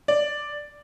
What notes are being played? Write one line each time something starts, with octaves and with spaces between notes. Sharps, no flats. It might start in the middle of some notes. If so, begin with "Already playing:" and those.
D5